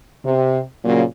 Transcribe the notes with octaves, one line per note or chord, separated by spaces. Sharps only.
C3
A#2 C#3 F#3 A#3